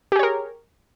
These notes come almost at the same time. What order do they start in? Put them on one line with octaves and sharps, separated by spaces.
G4 G#4 C#5 A#4